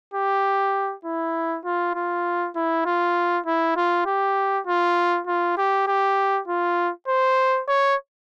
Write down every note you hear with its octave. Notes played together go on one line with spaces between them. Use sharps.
G4
E4
F4
F4
E4
F4
E4
F4
G4
F4
F4
G4
G4
F4
C5
C#5